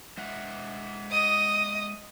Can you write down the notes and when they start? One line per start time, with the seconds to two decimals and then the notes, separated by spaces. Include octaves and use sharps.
0.17 G#3 E5 F#5
1.11 D#5 D#6